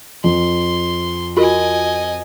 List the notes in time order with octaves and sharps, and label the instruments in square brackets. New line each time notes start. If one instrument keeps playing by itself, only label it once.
[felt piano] F2 [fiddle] C6
[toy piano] F4 F#4 A#4 [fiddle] D#5 G#5